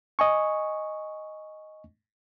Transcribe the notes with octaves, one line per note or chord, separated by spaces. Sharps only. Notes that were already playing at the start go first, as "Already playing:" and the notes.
D#5 G#5 C#6